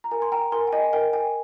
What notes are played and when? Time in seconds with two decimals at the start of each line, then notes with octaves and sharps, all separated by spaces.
0.04 A#5
0.11 A#4 G#5
0.22 C6
0.32 G5 A#5
0.52 A#4 G#5 C6
0.67 G5
0.73 D#5 G#5
0.93 A#4 G5
1.13 G5 G#5